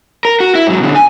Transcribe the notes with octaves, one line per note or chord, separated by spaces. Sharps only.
A#4
F#4
E4
G#2 F#3
B2 D3
G#5